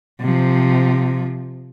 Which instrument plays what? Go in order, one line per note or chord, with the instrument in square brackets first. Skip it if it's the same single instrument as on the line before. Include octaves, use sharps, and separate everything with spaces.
[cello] C3 F3